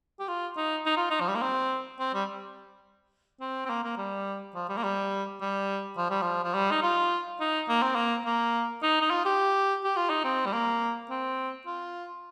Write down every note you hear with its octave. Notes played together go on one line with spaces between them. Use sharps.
G4
F4
D#4
D#4
F4
D#4
F3
G3
A#3
C4
C4
G3
C4
C4
A#3
A#3
G3
F3
G3
A#3
G3
G3
F3
G3
F3
F3
G3
D#4
F4
D#4
A#3
C4
A#3
A#3
D#4
D#4
F4
G4
G4
F4
D#4
C4
G3
A#3
C4
F4